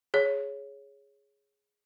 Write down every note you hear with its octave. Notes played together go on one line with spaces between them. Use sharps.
G#4 C#5